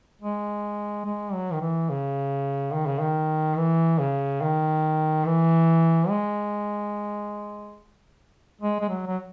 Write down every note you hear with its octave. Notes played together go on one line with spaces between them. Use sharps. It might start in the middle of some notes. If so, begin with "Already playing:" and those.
G#3
G#3
F#3
D#3
E3
C#3
D#3
C#3
D#3
E3
C#3
D#3
E3
G#3
G#3
G#3
F#3
F#3